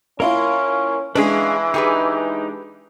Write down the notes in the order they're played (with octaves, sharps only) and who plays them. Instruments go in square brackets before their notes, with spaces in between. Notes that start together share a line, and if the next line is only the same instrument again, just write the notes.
[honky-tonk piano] A#3 E4 F4 [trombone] C#4 [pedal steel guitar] A#4 C6
[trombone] E3 [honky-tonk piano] G#3 D4 [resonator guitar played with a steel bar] C#4 G#4 [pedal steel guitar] B4 D#5 F5
[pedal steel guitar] D#4 [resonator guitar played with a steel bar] G4 G#4 B4